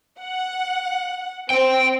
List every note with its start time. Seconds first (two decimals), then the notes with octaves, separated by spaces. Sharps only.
0.19 F#5
1.50 C4 G5